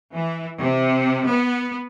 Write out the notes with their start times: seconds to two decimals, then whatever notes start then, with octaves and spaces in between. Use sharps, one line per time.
0.14 E3
0.59 C3
1.27 B3